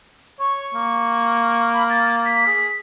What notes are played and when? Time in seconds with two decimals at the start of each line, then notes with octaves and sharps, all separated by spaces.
0.39 C#5 C#6
0.74 A#3
1.73 B5
1.90 A6
2.25 B6
2.47 G#4